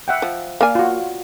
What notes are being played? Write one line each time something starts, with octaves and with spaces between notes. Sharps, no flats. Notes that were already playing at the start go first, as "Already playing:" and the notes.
E5 F#5 G5
F3
A#3 D5 F5 G#5
F4 F#4